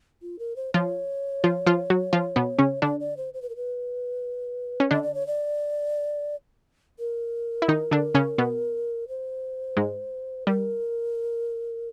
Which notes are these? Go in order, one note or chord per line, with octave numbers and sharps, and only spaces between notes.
F4
A#4
C5
F3 F4 C#5
F3 F4
F3 F4
F#3 F#4
F3 F4
B2 B3
C#3 C#4
D3 D4 D5
D5
C5
C5
B4
A#4
B4
C#4
D3 D4 D#5
D5
C#5
D5
A#4
E4
D#3 D#4
D3 D4
C#3 C#4
B2 B3
C5
G#2 G#3
G3 A#4